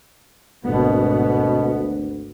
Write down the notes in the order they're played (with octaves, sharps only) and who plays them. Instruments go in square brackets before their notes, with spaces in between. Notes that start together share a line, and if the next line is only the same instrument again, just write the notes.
[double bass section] G#1 B3 [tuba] D2 [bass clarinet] B2